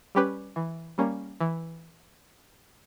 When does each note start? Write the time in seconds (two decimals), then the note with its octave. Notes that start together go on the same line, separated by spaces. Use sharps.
0.15 G3 C#4 G4 B4
0.56 E3
0.98 G3 A#3 C#4
1.41 E3